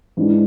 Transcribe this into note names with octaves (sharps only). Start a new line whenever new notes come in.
G#2 E3 G#3 D4